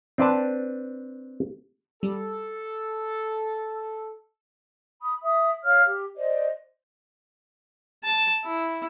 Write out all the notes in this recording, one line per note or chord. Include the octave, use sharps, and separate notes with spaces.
C4 D4 B4 A5
G3 A4
B5 D#6
E5 D#6
C#5 F5 F6
G4
C5 D5 D#5
A5
E4